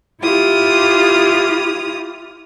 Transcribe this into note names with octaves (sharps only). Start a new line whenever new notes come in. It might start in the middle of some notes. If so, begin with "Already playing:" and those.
E4 F4 G4 D#6 F6